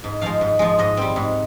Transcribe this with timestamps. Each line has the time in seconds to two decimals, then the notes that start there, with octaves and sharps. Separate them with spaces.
0.04 G#2
0.21 F3 G#3 F5
0.41 G#2
0.59 F3 G#3
0.79 G#2 D#5
0.97 G3 C4
1.16 G#2